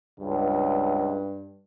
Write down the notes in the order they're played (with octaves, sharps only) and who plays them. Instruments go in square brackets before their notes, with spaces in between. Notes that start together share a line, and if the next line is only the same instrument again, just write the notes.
[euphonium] C#2 [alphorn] G2